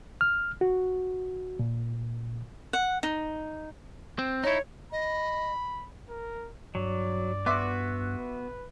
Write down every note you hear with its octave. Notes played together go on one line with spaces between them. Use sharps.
F6
F#4
A#2
F#5
D#4
C4
D#4 E4 C#5
D#5 B5
A#4
G2 F#3 D5
B3 F#4 E5 C6 D6
B4